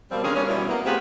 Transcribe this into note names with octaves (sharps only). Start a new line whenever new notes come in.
B2 F3 G3 A#3 C4
D3 D#3 C4 C#4 G#4 A#4
G2 A#3 C#4
B2 E3 G3
A#3 B3
A3 B3 C4 F4 G4 G#4